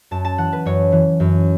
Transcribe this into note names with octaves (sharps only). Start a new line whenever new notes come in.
F#2 A5
A5
E3 F#5
B4
F#2 C#5
E3
F#2